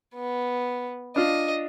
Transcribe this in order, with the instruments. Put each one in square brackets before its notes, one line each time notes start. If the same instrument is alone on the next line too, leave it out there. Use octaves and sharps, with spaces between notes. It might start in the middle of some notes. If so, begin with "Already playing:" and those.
[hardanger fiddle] B3
[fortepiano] D4 F4 [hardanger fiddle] D#5